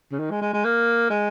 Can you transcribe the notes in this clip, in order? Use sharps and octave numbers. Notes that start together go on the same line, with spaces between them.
C#3
D#3
G#3
G#3
G#3
A#3
G#3